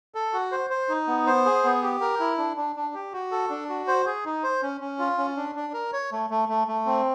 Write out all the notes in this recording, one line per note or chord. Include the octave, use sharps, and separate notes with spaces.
A4
F#4
C5
C5
D#4
B3
C5
G#4
B3
G4
A#4
E4
D4
D4
D4
G4
F#4
A4
D4
F#4
C5
G#4
D#4
C5
C#4
C#4
F4
C#4
D4
D4
A#4
C#5
A3
A3
A3
A3
C4